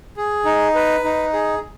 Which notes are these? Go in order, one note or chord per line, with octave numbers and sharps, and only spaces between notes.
G#4
D#4
B4
D#4
G#4